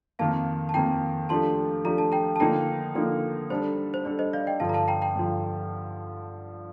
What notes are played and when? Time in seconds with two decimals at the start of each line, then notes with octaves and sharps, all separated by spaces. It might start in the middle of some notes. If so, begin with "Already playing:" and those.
0.19 F2 D#3 A#3 F5 A5
0.69 A5
0.74 F2 D#3 A#3 G5 A#5
1.29 F3 A3 D4 G4 A5 C6
1.84 F3 A3 D4 G4 A#5
1.98 A5
2.12 G5 A#5
2.36 A5
2.40 D3 F3 A#3 D#4 G5 A#5
2.95 D3 F3 A#3 D#4
3.50 G3 D4 A4 C5
3.94 C5
4.05 G3 D4 A4 D5
4.19 C5 D#5
4.33 D5 F5
4.47 D#5 G5
4.60 G2 D3 F3 F5 A5
4.69 A#5
4.74 F5 A5
4.88 G5 A#5
5.02 G5 A#5
5.16 G2 D3 F3